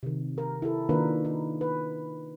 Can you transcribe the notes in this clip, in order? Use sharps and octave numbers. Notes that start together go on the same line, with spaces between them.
C3 D#3
A#4
E4 G4 A4
D#3 A#3 D4 F4 A#4 B4
D#4
B4